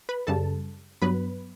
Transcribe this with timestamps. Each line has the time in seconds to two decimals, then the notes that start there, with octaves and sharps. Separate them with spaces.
0.09 B4 B5
0.27 F#2 C#3 G3 A4 A5
1.02 G2 F#3 B3 B4 B5